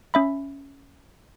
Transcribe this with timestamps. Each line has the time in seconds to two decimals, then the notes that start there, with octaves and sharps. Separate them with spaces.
0.14 C#4 E5 B5